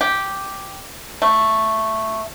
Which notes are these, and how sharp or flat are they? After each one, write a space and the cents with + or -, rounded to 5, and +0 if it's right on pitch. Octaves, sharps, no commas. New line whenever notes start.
G4 -5
A3 +5